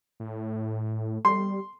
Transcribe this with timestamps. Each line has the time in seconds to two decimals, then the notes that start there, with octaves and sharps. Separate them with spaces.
0.20 A2
1.25 G3 C6